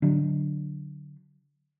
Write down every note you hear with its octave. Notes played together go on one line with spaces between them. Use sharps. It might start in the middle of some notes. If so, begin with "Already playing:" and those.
D3 F#3 D4